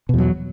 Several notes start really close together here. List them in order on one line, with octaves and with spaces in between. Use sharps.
B2 E2 F#3